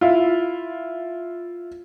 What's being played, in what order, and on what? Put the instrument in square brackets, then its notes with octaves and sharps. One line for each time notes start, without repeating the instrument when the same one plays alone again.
[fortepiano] E4 F4